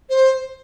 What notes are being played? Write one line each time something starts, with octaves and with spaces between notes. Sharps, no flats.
C5